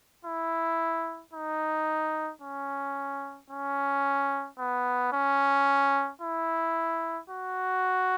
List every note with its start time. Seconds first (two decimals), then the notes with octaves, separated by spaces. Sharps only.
0.25 E4
1.33 D#4
2.42 C#4
3.50 C#4
4.59 B3
5.13 C#4
6.21 E4
7.30 F#4